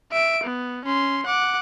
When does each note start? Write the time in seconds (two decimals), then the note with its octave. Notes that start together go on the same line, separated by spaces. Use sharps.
0.12 E5 D7
0.43 B3
0.85 C#4 C6
1.26 F#5 D6